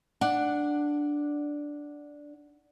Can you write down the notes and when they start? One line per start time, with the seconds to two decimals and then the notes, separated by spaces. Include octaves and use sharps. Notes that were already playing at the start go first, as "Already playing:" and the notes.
0.21 D4 F#5